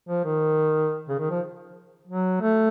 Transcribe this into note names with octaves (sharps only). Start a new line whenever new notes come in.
F3
D#3
C#3
D#3
F3
F#3
A3